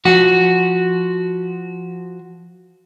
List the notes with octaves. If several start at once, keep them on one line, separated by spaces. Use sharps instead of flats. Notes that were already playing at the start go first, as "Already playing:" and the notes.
F3 F#4